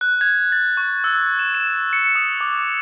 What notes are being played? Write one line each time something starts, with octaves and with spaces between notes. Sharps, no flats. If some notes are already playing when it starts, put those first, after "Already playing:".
F#6
G#6
A6
C#6
E6
E7
E7
C#7
D#6
D6